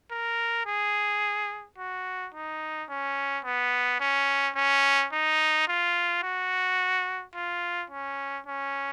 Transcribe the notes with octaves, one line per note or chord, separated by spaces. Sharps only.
A#4
G#4
F#4
D#4
C#4
B3
C#4
C#4
D#4
F4
F#4
F4
C#4
C#4